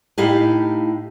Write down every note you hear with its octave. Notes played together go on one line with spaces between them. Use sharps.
A2 D#4 E4 G4 F5